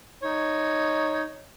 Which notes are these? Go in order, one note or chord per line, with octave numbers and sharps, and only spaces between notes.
D#4 C#5